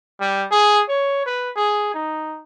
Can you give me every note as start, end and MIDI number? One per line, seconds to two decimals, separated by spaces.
0.20 0.46 55
0.51 0.82 68
0.89 1.25 73
1.26 1.51 71
1.56 1.90 68
1.94 2.41 63